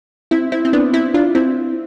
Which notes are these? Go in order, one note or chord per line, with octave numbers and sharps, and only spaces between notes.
C4 E4
C4 E4
C4
B3 D4
C4 E4
D4 F4
C4 E4